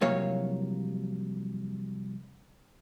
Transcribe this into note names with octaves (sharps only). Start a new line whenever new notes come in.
C2 F2 F#3 A#3 C#5 F5